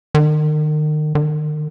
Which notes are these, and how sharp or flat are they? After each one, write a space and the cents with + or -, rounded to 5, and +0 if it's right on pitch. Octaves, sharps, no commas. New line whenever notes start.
D#3 -35
D#3 -40